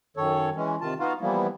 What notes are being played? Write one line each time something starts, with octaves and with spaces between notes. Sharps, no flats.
F#2 D#3 A4 C#5
E3 G#3 C#4
C3 D#3 F4 A5
B3 D#4 F4 F#4 F5
E3 F3 G3 A#3 B3 E4